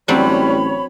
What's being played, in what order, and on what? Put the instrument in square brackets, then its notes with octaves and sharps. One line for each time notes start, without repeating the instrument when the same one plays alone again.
[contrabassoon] A1 [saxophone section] E3 G3 [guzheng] F#3 C4 D4 [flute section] C#5 B5